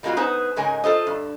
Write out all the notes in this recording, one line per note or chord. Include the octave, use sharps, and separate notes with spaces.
G3 G#3 A#3 D#4 F4 F#4
B3 D#4 G#4 B4 C5
G#2 C#3 G#3 A#4 G#5
F4 A4 C5 D#5
G2